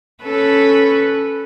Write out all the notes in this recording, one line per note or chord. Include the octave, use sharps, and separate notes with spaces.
C#4 A4 B4